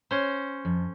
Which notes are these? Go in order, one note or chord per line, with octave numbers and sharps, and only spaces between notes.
C#4 C5
F2